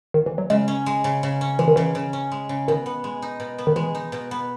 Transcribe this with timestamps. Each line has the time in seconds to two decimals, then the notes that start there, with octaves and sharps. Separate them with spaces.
0.14 D#3
0.26 E3
0.38 F#3
0.50 C#3 G#3
0.68 C#4
0.86 G#3
1.04 C#3
1.23 C#3
1.41 C#4
1.59 E3 G#3
1.68 D#3
1.76 C#3 E3
1.95 C#3
2.13 C#4
2.32 G#3
2.49 C#3
2.68 B2 D#3
2.86 B3
3.04 G#3
3.22 D#4
3.40 B2
3.58 B3
3.67 D#3
3.76 E3 G#3
3.95 D#4
4.12 B2
4.31 B3